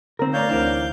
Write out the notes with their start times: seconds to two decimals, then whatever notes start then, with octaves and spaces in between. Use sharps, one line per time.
0.19 D3 C4 D#4 A#4
0.33 A3 C#5 D5 F5 A#5 G6
0.49 D2 E3 D4 A#4 C5